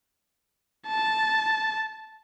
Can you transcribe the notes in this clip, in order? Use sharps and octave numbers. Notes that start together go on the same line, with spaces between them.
A5